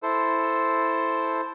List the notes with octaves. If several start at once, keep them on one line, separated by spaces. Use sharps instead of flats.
E4 A4 C5